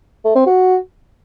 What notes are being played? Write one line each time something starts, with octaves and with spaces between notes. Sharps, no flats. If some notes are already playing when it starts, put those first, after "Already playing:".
A3
C4
F#4